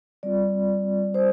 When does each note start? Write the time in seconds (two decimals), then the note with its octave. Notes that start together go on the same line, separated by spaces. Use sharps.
0.23 G3 C4 F4 D5
1.14 C5